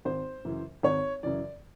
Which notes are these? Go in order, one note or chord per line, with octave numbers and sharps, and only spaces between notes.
G#1 C5
F#2 C#3 E3
G#1 C#5
F#2 C#3 E3 D5